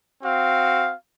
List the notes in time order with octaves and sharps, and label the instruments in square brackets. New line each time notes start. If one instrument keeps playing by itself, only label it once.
[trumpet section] C4 F#4 F5